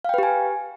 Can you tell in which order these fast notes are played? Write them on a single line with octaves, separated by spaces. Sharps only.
F5 G5 B4 G4 G#5